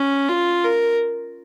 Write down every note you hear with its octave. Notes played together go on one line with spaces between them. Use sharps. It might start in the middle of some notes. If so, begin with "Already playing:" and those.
Already playing: C#4
F4
A#4